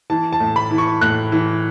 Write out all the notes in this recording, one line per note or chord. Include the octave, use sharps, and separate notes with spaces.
E3 A5
A5
A2
B5
E3
C#6
A2 F#6
E3